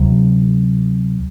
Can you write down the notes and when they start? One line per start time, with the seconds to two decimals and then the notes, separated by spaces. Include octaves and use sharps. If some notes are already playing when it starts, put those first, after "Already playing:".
Already playing: D2 C3 F#3